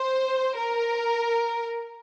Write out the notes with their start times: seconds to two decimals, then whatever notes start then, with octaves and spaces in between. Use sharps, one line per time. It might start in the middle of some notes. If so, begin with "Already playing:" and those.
Already playing: C5
0.57 A#4